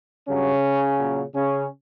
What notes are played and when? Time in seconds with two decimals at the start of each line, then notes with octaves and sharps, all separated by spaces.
0.27 G2 C#3 F#3 C#4
0.98 A#2 F#3
1.34 C#3 C#4